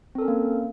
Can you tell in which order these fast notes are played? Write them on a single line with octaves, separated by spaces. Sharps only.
C4 A4 A#4 C#4 A#3